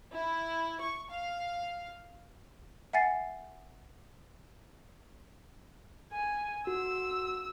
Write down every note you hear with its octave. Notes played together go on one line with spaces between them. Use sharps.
E4
C#6
F5
E5 F#5 G#5 A6 C7
G#5
F#4 E6